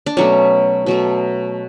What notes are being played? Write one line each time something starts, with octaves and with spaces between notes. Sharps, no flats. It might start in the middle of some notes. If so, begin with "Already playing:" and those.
D4
B2 F#3 A3 C#4
B2 F#3 A3